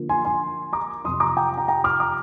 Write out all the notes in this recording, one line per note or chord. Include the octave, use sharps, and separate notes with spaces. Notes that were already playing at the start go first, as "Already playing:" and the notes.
Already playing: D3 F3 A#3 F4
G#5 C6
G#5 C6
A#5 D6
F2 C3 F3 C6 D#6
A#5 D6
G5 A#5
G5 A#5
G5 A#5
D6 F6
A#5 D6